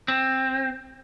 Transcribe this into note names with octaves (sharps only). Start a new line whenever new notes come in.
C4